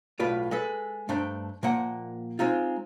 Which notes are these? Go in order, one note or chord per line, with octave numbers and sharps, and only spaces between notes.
B1 A2 F4 B4 D5
G#3 A4 B4
G2 A3 D4 C5 G5 A#5
A#2 F3 A#3 F#5 G5
G#3 C4 D#4 F4